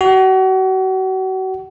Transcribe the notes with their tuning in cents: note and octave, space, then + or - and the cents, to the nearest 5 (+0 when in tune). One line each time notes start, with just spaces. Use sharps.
F#4 +35